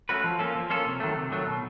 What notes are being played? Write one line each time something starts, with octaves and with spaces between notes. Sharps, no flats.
A3 C#4 F#4 B4
F3
A#3 C#4 F4 A4
F3
A#3 C#4 F4 A4
C3
D#3 F#3 A3
C3
D#3 F#3 A3
B2